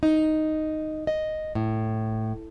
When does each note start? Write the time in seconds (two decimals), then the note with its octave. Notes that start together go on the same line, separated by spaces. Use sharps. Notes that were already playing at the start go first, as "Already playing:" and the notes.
0.03 D#4
1.07 D#5
1.55 A2